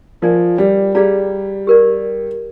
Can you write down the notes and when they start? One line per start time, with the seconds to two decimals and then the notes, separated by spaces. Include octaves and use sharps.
0.22 F3 F4 A#4 D5 G#5
0.58 G3
0.95 G3 G#4 D5 F5 A#5
1.67 G4 A#4 D5